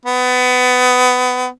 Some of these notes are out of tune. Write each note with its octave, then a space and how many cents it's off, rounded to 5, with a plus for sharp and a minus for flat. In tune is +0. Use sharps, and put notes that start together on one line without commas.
B3 +25